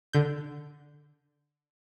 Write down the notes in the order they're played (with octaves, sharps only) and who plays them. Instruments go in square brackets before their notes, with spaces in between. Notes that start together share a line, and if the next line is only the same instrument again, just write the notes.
[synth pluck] D3 G6